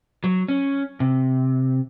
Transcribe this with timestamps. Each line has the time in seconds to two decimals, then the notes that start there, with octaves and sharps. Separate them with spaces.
0.24 F#3
0.48 C#4
1.00 C3